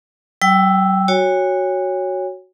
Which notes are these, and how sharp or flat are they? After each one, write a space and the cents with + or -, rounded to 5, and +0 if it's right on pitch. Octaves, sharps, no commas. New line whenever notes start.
F#3 +40 G5 +0 E6 +0
F#4 +0 C#5 +0 G#5 -40